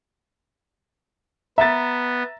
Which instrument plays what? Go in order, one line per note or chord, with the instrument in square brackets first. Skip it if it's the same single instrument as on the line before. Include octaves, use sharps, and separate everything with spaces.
[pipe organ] B3 [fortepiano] E5 [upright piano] A#5 A6